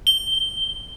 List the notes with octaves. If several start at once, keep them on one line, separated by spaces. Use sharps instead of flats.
G7